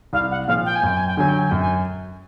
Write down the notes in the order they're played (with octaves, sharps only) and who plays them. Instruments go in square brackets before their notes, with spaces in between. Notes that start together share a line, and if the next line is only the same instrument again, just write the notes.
[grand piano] C2 [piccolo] F5
[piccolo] F#5
[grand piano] A#2 F3 [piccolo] F5
[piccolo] G5
G#5
[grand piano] F#2 [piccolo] G5
[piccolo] G#5
G5
[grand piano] D3 F#3 [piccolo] G#5
[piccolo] G5
G#5
[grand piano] F#2 [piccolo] G5
[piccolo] G#5